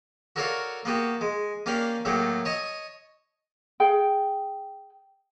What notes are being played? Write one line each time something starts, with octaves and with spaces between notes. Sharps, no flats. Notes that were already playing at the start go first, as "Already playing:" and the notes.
F#4 A4 A#4 C#5 D5 F5
A#3 B3 F#4 G4
G#3
A#3 C#4 D4 G4 F5
A2 F#3 A3 A#3 G4
C#5 D#5 A5
G#4 G5